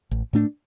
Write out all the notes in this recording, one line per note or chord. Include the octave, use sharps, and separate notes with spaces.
A1
A2 A3 D4